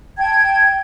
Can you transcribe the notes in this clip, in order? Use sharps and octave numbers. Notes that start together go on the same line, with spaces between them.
G5 A5 G#6